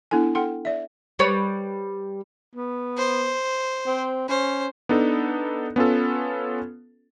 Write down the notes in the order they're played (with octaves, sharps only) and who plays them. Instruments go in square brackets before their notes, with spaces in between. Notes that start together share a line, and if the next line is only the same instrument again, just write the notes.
[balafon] B3 D4 E4 A4 G#5
A4 F#5 G5 C6
D5 E5
[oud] G3 B4 C#5
[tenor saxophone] B3
[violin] C5
[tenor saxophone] C4
[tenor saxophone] C#4 [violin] C5
[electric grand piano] B3 D4 D#4 A4
B3 C#4 F4 A4